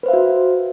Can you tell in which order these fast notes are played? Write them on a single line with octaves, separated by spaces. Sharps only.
B4 C5 F5 E5 F#4